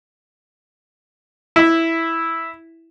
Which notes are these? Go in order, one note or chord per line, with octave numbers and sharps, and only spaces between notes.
E4 E5